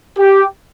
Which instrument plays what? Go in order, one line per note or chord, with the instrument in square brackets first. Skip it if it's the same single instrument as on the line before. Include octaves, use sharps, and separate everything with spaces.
[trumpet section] G4